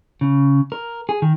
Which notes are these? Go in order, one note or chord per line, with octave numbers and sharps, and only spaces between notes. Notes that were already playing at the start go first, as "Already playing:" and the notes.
C#3
A#4
G#4
D#3